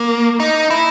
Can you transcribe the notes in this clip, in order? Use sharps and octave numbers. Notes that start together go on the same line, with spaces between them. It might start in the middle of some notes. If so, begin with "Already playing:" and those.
Already playing: A#3
D#4
E4